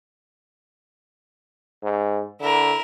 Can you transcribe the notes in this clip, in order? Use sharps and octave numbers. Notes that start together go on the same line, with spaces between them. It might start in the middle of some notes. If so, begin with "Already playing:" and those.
G#2
D3 E4 A#4